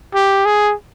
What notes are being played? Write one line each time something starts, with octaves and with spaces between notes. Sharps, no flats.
G4
G#4